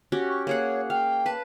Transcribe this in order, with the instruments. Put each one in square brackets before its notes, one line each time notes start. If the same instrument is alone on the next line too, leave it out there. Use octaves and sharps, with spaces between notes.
[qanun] C#4 F#4 G4
[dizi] C#6
[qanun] A#3 G#4 F#5 [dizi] C#5
[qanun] F5 [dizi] G5
[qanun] B4 A5